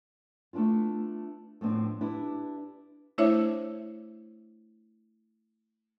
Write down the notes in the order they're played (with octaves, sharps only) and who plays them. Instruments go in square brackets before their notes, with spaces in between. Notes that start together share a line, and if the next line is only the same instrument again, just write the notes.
[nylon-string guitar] A3 B3 D4 E4 F4
A2 F3 B3 C4 D4
D4 E4 G4 B4
[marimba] A3 D4 E4 C5 C#5 E5